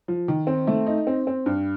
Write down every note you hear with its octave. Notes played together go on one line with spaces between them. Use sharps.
F3
D#3
C4
A3
D#4
C4
C4
G2